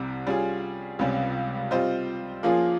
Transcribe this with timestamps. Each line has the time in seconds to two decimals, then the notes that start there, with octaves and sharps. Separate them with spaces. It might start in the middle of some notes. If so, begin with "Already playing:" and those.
Already playing: C2 C3 G3 C4
0.27 G3 C#4 F4 G#4
0.99 C#2 C3 G3 C#4
1.71 G3 C4 F4 C5 D#5
2.43 F3 A#3 C#4 F4 G#4